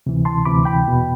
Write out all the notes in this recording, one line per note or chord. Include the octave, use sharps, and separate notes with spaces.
D2 C3 E3
A5 C6
D2 C3 E3 B5 D6
G5 B5
E2 B2